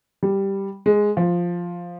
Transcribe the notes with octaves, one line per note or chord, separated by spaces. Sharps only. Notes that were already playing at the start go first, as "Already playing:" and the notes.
G3
G#3
F3